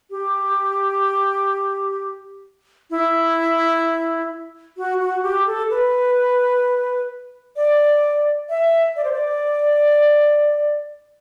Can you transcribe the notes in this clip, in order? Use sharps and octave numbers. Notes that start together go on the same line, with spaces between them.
G4
E4
F#4
F#4
G4
A4
B4
D5
E5
D5
C5
D5